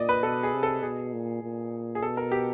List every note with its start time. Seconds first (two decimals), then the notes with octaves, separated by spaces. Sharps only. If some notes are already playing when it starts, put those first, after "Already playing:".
Already playing: A#2 D5 D#5
0.09 B4
0.23 B2 A4
0.43 G#4
0.54 C3
0.63 A4
0.82 B2 G#4
1.13 A#2
1.43 A#2
1.95 G#4
2.02 B2 A4
2.17 A#4
2.32 G4